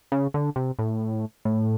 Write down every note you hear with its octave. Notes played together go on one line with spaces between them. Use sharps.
C#3
D3
C3
A2
A2